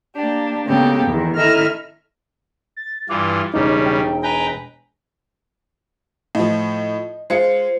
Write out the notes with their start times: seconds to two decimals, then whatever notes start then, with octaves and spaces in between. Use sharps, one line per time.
0.16 A#3 D4 G4
0.66 C#3 G#3 A#3 B3 G4 A4
1.06 E2 D#3
1.36 D#3 E4 A4 D#5 E5 F6
2.77 A6
3.09 G2 E3 F4 D6
3.54 E1 C#3 G3 D#4
3.85 G5
4.23 B4 G5 G#5 A#5
6.35 A2 F3 D#5
7.30 G#3 F4 C5 C#7